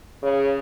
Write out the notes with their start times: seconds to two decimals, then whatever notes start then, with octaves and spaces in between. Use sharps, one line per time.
0.23 C#3